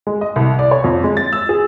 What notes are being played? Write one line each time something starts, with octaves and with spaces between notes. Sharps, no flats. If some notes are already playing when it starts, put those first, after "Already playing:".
G#3
D#5
C2
D5
C#5
F2
G#3
A6
E6
G#4